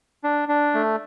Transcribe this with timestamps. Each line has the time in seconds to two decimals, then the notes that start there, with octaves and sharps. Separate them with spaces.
0.24 D4
0.49 D4
0.74 A3